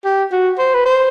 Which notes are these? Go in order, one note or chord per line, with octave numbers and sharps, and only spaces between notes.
G4
F#4
C5
B4
C5